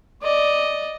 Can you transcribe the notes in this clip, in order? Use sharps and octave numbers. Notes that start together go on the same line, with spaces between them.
D5 D#5